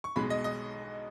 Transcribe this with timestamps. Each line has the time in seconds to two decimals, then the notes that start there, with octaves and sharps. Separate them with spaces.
0.04 C#6
0.16 B1 B2 G#3 B5
0.30 D#5
0.44 D#5